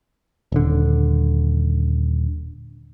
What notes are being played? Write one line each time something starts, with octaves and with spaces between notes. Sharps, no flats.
D#1 D3